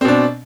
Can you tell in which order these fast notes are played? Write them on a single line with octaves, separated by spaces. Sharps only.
C4 B2 D4